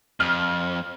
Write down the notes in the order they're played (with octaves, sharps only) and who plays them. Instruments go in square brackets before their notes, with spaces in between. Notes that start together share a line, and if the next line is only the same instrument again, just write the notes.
[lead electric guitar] F2 [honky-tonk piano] F6